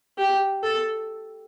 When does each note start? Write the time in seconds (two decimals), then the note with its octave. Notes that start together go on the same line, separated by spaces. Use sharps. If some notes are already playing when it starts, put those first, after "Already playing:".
0.18 G4
0.63 A4